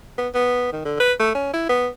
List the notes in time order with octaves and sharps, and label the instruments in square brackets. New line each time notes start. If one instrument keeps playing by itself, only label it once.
[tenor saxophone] B3
B3
D#3
D3
B4
A3
C#4
E4
B3